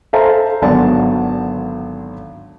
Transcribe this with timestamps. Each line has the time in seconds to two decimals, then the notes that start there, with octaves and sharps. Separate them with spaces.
0.13 A4 C5 E5 F5 A5 A#5
0.62 G#1 D3 F#3 B3 D5 A5